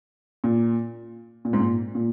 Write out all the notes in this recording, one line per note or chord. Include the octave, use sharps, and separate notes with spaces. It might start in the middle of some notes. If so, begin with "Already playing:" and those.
A#2
A#2
G#2
A#2
A#2